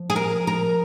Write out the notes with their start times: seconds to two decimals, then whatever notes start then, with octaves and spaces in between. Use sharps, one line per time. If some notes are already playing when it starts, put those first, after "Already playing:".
Already playing: F3
0.10 G#4
0.16 A#4
0.47 A#4